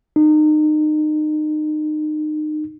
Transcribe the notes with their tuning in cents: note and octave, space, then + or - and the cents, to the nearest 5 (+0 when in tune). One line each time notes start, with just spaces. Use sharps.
D#4 -30